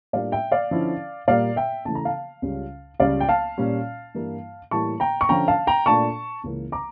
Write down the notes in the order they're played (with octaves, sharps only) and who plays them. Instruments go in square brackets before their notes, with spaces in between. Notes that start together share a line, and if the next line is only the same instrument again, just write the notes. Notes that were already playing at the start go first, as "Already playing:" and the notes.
[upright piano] A2 G3 A#3 D4 F4 D5 F5
E5 G5
D5 F5
D3 F3 C#4 E4
A#2 G3 A#3 D5 F5
E5 G5
C#3 E3 A3 A5
A#5
F5 A5
C#2 C#3 G3 C#4 F4
C#2 C#3 G3 C#4 F4 D5 F5
G5
F5 A5
A#2 G3 C#4 F4
G2 E3 G3 A#3 E4
A2 E3 G3 A#3 E4 A5 C#6
G5 A#5
C#6
D3 F3 C#4 F4 G5 A#5
F5 A5
G5 A#5
A#2 A3 D4 F4 A5 C#6
C#2 C#3 E3 A#3
A#5 D6